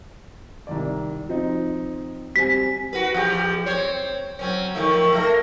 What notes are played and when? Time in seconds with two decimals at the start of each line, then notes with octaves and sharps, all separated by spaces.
0.67 C2 D#3 D5
1.29 F3 C4 D#4
2.36 G3 C4 G#5 B6
2.93 F#4 B4
3.14 E2 F3 G4
3.66 C4 C5 C#5
4.39 F#3 C4 C#4
4.75 D#3 F3 A3
5.12 A3 A#3